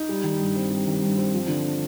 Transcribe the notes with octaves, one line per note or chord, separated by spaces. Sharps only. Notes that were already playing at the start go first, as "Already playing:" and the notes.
Already playing: D#4
G3
D#3
G2
C4
G3
D#3
G2
C4
F3
D3